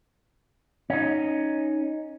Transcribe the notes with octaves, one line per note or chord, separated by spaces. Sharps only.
C#4 D#4